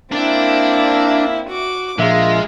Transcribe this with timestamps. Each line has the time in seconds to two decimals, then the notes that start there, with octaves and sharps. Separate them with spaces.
0.12 A#3 C4 D4 E4 E5
1.49 F#4 D6
1.98 A#1 G#3 A#3 F4 E5